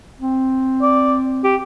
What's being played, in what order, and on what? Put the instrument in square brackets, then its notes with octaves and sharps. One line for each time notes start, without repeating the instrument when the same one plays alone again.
[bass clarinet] C4
[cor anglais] D5
G4